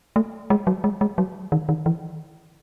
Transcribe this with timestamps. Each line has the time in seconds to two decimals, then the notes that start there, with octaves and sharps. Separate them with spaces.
0.16 A3
0.50 G#3
0.67 F#3
0.84 G#3
1.01 G#3
1.18 F#3
1.52 D#3
1.69 D#3
1.86 E3